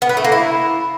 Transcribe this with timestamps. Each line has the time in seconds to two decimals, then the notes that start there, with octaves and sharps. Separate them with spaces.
0.02 B3
0.09 B4
0.17 A3
0.24 A#3
0.32 E4